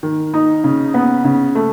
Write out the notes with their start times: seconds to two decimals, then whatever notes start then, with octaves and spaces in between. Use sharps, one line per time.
0.03 D#3
0.34 D#4
0.64 C#3
0.94 B3
1.24 C#3
1.55 A3